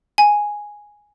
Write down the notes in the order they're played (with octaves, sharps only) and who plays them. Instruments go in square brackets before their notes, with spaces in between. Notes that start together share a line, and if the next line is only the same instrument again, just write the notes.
[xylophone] G#5